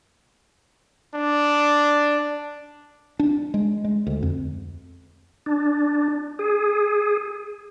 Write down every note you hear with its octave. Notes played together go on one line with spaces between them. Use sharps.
D4
D4
G#3
G#3
D2
F2
D4
G#4